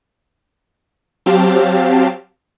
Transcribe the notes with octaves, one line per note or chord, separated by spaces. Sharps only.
F#3 C4 G4 F5 A5